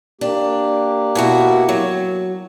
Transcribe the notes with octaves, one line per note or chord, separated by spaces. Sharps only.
A#3 D4 G4
B2 E4 F#4
F#3